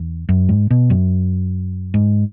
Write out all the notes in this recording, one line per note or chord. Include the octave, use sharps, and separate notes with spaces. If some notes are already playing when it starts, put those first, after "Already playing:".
Already playing: E2
F#2
G#2
B2
F#2
G#2